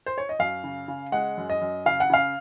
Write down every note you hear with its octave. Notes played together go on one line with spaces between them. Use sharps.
C5
C#5
D#5
F#2 F5
C#3
C#3
G#3 F#5
F#2
D#5
F#2
C#3 F5
F#5
C#3 F5